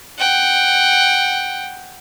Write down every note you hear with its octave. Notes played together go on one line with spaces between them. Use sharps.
F#5 G5